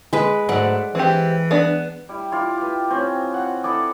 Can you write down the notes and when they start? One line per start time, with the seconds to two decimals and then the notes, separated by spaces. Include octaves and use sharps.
0.13 G#3 B4
0.49 G#2 F#3 A3 D5 F#5
0.95 E3 C4 G4
1.51 B3 D4
2.09 G3 E4
2.32 E4 F4 D5
2.58 G4 B4
2.90 C4 C#4
3.34 F#5
3.63 E4 A4 D5 D#5